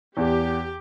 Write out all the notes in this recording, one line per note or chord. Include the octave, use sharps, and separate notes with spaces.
E2 G4